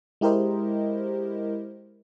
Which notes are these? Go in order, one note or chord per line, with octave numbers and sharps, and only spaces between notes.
G#3 E4 G4 A#4 C5 D#5